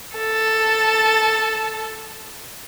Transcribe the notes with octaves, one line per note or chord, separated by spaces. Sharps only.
A4 A5